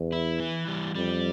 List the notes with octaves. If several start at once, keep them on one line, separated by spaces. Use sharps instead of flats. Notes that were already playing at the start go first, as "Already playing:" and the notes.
Already playing: E2
E4
E3
G3
F2 G3